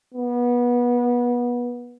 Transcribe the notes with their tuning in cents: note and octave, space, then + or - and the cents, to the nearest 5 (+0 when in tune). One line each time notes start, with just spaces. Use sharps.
B3 -25